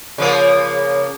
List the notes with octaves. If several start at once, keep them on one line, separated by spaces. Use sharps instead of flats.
C#3 F3 A#3